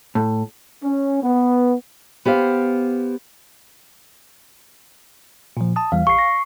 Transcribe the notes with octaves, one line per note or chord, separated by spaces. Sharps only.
A2
C#4
B3
B3 G4 C5 F5
A#2 F3
A5 D#6
E2 E3 G3 F5
A1 C#6 C7
A#6